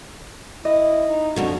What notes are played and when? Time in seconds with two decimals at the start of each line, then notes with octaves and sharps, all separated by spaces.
0.65 E4 D#5
1.09 D#4
1.36 F2 B2 D3 F#4